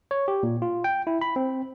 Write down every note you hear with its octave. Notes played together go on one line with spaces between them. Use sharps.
C#5
G4
A#2
F4
G5
E4
B5
C4